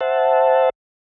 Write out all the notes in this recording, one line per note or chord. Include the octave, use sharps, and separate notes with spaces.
C5 E5 F#5 A5